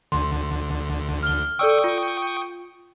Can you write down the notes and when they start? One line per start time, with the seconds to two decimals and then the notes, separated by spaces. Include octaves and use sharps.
0.12 D2 D3 C6
1.23 F6 G7
1.59 A4 D5 G5 C#6 D#6 E6
1.84 F4